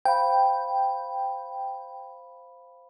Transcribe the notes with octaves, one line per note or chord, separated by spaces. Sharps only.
C5 F5 G5 B5